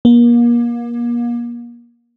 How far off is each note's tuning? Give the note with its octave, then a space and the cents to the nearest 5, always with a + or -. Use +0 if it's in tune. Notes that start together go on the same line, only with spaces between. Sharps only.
A#3 +35